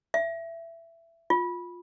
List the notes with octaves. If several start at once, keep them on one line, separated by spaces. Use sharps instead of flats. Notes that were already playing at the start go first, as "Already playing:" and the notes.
E5
F4